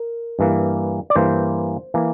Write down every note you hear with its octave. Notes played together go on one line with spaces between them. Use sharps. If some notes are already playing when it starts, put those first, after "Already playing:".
Already playing: A#4
G2 E3 A#3
D5
G2 E3 A#3 C5
E3 A#3